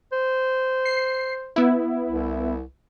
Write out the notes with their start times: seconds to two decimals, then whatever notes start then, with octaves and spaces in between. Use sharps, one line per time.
0.12 C5
0.85 C7
1.56 B3 E4
2.09 C2